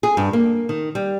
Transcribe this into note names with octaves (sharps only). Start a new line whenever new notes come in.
G#4
G2
A#3
D#3
G3